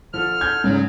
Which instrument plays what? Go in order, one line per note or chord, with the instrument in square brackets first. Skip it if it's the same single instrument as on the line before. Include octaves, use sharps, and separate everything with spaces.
[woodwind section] D3 A4 F6 [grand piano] F3
[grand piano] G6 G#6
[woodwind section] E2 F#3 [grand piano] G#2 C#3